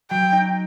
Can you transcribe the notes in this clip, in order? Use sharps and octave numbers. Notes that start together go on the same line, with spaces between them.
F#3 G5
D#4